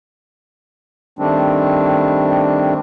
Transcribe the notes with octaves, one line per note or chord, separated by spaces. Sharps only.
D#3 G3 A3 C4 D4